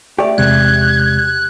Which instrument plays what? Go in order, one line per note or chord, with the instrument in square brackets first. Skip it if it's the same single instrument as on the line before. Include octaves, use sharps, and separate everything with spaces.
[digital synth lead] A3 [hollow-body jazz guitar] G4 D5
[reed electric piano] E2 C3 G#3 [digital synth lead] F#6 [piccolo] G#6